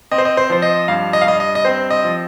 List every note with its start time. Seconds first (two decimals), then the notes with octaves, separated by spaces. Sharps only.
0.12 C4 D#5
0.18 C5
0.25 D#5
0.37 C5
0.50 F3 C5
0.62 D#5
0.88 G2 F5
1.13 D#5
1.21 F5
1.26 G2 D#5
1.40 D#5
1.55 D#5
1.65 C4 C5
1.90 D#5
2.04 F3